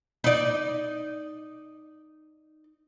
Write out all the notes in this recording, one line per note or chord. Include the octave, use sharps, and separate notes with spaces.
D#4 D5